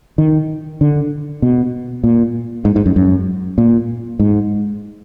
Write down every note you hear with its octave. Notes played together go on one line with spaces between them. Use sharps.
D#3
D3
B2
A#2
G#2
G#2
F#2
F#2
A#2
G#2